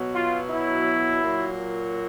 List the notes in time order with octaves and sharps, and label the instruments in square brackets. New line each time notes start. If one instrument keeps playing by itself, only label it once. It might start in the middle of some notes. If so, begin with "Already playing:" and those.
Already playing: [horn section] B2 F#3
F4
E4
A#2 F#3